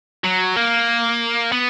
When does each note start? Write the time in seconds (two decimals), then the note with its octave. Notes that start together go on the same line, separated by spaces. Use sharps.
0.24 F#3
0.56 A#3
1.52 B3